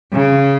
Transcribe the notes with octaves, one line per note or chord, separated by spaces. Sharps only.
C#3